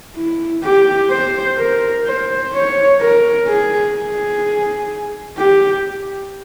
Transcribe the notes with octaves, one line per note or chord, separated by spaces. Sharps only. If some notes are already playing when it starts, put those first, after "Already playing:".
E4
G4
C5
A#4
C5
C#5
A#4
G#4
G#4
G4